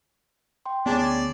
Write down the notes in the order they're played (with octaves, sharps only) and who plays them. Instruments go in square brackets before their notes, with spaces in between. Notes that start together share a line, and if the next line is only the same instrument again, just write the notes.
[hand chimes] G5 C6
[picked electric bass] D2 B3 [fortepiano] C#4 G#4 A5 [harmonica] D4
[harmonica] D5